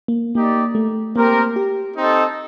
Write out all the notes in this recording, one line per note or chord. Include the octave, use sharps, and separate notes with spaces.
A#3
A#3 D#4 G4 D5
A3
A#3 C4 G4 A#4
G4
C4 D#4 A4 D#5